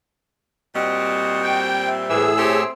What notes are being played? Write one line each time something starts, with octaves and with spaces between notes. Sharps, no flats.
A#2 G3 C4 F#4 D#5
G5
E5
A2 E3 G#4 E6
A3 C4 G4 C#5